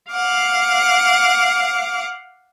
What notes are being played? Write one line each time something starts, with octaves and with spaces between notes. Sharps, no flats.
F5 F#5 D6